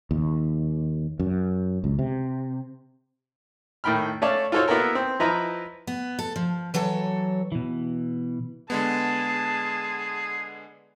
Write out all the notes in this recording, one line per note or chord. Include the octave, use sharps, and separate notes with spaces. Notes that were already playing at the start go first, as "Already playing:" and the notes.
D#2
F#2
C#2
C3
A2 D#3 G5 B5 F6
A3 C#4 C#5 D5 F5 A5
F4 F#4 A4 C5 C#5
A#3 B3 E4 F#4 A4 A#4
C4
F3 E4 B4 D#5 A#5
B3
A4
F3
E3 F#3 A4 C#5
B2 E3
D3 G#3 B3 G#4 A5